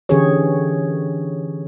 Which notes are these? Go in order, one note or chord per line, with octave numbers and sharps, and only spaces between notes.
D3 E3 C#4 G4 G#4 C#5